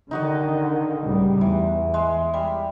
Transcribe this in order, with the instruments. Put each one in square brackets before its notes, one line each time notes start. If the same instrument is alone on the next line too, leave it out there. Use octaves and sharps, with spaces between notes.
[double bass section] D3 D#3 [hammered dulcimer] D#4 F#4 D#5
[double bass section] C#2 A2 G3
[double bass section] E2 [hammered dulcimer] E3
[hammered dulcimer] G#3
G3